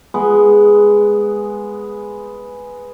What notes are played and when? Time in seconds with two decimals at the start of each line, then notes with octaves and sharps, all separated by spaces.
0.14 G#3 B3